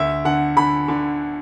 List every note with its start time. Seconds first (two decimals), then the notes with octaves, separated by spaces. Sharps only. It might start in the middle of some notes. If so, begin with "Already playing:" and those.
Already playing: D2 E5
0.25 D3 F#5
0.57 D3 B5
0.88 D3